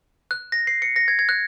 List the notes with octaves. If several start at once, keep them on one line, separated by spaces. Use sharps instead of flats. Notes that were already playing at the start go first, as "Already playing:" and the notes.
F#6
A#6
C7
C#7
A#6
G#6
G#6
F#6